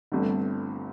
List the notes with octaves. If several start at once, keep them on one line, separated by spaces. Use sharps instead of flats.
G1 G2 D3 A3 C4